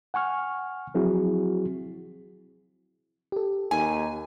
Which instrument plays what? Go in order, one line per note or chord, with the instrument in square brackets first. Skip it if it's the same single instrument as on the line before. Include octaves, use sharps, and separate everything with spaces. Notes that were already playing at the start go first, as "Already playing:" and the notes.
[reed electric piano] F#5 G#5 C#6 F6
F3 F#3 C4 E4 F#4 G#4
[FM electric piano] G4 A4
[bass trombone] D#2 [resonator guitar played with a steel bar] G#5